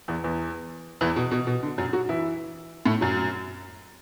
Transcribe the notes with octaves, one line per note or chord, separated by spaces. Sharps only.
E2 E3
E2 E3
E2 E3
B2
B2
B2
D3
F#2 F#3
F#3 F#4
E3 E4
A2 A3
F#2 F#3